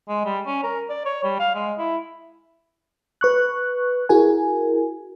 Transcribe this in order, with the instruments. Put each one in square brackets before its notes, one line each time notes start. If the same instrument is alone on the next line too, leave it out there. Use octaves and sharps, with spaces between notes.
[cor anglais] G#3
G3
C#4
A#4
D5
C#5
G3
F5
G#3
E4
[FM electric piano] B4 C#6 F#6
E4 F#4 G#4 A#4 G#5